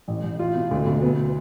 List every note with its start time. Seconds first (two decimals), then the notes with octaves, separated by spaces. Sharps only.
0.08 A1
0.24 A1
0.39 F4
0.55 B2
0.71 D2
0.87 D2
1.02 B3